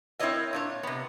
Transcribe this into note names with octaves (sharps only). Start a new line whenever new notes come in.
C4 E4 A#4 C#5 D#5 E5
A#2 D4 C#5
C3 B3